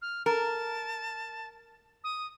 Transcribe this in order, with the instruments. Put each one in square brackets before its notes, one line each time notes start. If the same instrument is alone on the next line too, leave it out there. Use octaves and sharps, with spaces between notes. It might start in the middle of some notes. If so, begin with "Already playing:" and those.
[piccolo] F6
[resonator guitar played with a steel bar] A#4 [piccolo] A5
[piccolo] D#6